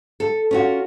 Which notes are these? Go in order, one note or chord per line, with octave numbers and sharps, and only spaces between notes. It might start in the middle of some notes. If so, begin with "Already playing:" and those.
A4
C#4 F4 F#4